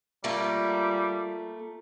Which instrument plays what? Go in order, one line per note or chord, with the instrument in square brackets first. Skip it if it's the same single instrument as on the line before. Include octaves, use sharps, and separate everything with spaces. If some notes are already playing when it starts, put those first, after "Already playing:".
[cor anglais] G3 [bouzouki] A3 A#3 F4